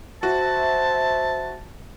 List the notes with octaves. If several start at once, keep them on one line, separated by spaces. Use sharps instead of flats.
F#4 C5 E5 A5